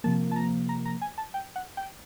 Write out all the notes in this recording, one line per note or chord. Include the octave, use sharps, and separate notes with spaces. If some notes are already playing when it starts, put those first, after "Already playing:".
C3 F3 A#3 A5
A5
A#5
A#5
A#5
G#5
A5
G5
F#5
G5